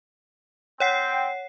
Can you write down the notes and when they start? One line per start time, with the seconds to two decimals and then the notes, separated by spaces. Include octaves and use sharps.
0.80 C4 C#5 F#5 G5 C7